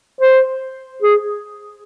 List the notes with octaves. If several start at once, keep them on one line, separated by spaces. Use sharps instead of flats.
C5
G#4